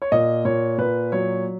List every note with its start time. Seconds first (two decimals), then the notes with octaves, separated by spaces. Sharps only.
0.02 C#5
0.12 A#2 D#5
0.45 A#2 C#5
0.78 A#2 B4
1.12 F#3 C#5